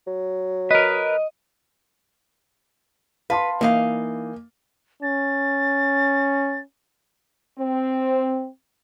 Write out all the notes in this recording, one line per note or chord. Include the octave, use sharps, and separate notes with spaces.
F#3
A#4 B4 D#5
B4 F5 A5 C6
E3 A#3 D#4 F5
C#4 A6
C4